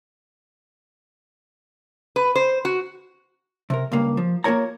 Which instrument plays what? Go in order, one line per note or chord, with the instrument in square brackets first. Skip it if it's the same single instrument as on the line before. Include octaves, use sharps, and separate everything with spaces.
[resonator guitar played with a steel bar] B4
C5
F#4
[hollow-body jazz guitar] C3 A#4
C#2 G2 A#3
F3
A#3 F4 A#4 C#5 A#5